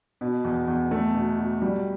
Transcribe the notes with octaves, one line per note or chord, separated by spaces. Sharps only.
B2
E2
E2
A3
B2
F#4
G3